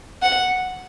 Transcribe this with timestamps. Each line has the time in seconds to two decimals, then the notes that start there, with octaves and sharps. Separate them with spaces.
0.22 F#5